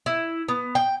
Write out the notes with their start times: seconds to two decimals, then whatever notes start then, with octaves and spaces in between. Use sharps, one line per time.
0.06 E4
0.48 B3
0.75 G5